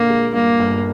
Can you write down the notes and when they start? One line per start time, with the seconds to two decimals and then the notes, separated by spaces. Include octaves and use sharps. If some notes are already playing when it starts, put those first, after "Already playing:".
Already playing: A#2 D3 A#3
0.10 G#3
0.34 G2 A#3
0.59 G1